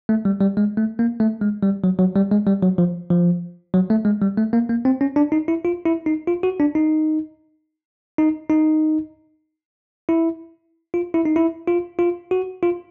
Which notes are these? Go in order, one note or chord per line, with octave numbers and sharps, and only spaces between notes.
A3
G3
G3
G#3
A3
A#3
A3
G#3
G3
F#3
F#3
G3
G#3
G3
F#3
F3
F3
F#3
A3
G#3
G3
A3
A#3
A#3
C4
C#4
D4
D#4
E4
F4
E4
D#4
F4
F#4
D4
D#4
D#4
D#4
E4
F4
E4
D#4
E4
F4
F4
F#4
F4